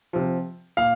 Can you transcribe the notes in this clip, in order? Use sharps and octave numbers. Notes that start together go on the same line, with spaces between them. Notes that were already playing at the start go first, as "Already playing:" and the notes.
C3 F3
A#2 F5